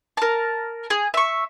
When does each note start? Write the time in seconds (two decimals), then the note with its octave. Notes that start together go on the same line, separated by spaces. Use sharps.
0.17 A#4 A5
0.90 G#4
1.14 E5 C#6